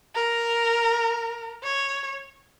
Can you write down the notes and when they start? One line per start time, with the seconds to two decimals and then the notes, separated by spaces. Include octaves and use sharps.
0.15 A#4
1.63 C#5